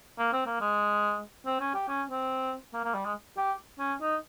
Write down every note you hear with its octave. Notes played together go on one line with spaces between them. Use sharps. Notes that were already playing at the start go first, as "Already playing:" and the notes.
A#3
C4
A#3
G#3
C4
C#4
G4
C#4
C4
A#3
A#3
G3
G#3
G4
C#4
D#4